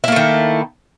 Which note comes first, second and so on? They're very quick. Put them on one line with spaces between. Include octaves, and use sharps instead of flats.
E4 A#3 A3 D#3